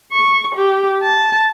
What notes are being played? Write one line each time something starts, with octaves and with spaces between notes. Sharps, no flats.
C#6
G4
A5